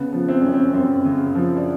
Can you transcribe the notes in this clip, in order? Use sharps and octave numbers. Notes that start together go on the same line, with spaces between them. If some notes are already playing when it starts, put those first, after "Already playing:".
Already playing: C#3 B3
F3
C4
F#2 C#4
C4
F#2 C4
C#3
F3
D4